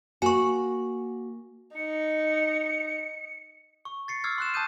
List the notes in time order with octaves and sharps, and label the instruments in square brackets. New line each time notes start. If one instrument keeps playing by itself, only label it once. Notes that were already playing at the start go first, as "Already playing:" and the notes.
[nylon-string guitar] A#3 F#4 [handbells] G#5 C#6
[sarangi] D#4 [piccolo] C#7
[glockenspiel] C#6
A6 C7 C#7
D6 E6 F6 G#6 C7
C6 F#6 E7
A5 D#6 G6 D#7